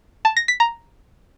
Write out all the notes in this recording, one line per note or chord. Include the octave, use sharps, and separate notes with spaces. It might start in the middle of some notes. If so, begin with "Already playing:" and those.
A5
A#6
B6
A#5